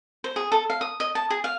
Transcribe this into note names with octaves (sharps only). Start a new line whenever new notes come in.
C5
G#4
A4
F5
D#6
D#5
A5
G#4
F5